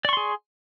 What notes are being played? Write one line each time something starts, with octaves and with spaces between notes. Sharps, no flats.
G#4 D5 C6 C#6